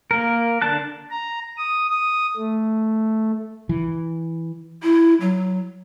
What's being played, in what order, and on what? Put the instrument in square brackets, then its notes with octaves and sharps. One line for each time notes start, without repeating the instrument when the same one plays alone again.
[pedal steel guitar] A#3 A#4
D3 D4 A5 F#6
[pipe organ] A#5
D#6
D#6
A3
[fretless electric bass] E3
[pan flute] E4
F#3